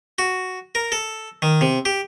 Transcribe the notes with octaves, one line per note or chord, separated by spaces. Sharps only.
F#4
A#4
A4
D#3
C3
G4